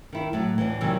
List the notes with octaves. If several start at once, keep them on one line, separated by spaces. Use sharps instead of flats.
D#3 E4
A2 F#3
D2 A2 E3
C3 D#3 E3 F#3 G3